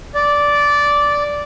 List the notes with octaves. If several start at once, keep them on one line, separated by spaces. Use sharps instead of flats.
D5